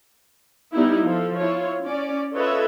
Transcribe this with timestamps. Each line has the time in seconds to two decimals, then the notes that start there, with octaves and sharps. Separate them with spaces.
0.73 G3 B3 D#4 E4
1.04 F3 A4
1.38 E4 F4 C#5
1.84 C#4 D5
2.35 F4 A4 B4 C#5 D#5 E5